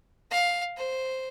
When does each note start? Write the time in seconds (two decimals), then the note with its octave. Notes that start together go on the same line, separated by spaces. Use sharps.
0.31 F5
0.77 C5